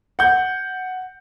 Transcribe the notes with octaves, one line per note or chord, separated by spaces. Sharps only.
F#5 G6